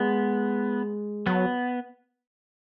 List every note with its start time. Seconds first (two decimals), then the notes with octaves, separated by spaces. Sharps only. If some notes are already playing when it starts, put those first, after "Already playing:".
Already playing: G#3 B3
1.26 F#3 B3